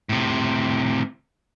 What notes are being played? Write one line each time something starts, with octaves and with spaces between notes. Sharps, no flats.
A2 C3